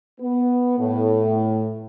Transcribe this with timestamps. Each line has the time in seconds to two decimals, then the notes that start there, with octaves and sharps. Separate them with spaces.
0.21 B3
0.79 A2